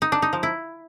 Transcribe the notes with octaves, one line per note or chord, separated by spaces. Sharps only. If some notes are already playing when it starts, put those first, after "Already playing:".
D#4
D4
D#4
F3
E4